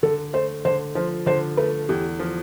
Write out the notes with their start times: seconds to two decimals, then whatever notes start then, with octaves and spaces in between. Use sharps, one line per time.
0.03 D3 A4
0.33 A3 C5
0.65 D3 C5
0.95 F3 C5
1.26 D3 C5
1.57 A3 B4
1.89 E2 G4
2.19 F3